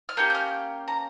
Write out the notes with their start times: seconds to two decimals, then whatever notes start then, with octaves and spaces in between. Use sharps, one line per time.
0.09 F6
0.17 A#3 C#4 G4 G6
0.30 G6
0.35 F6
0.88 A#5